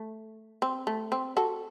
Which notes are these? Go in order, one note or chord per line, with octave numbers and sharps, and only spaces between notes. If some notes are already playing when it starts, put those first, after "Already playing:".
Already playing: A3
C4
A3
C4
F#4 A4